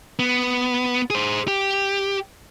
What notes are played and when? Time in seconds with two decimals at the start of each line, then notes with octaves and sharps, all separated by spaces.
0.19 B3
1.10 G#4 C5
1.48 G4